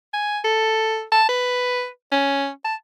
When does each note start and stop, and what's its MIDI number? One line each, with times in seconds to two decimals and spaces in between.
0.13 0.39 80
0.44 1.03 69
1.12 1.25 81
1.29 1.88 71
2.12 2.49 61
2.64 2.75 81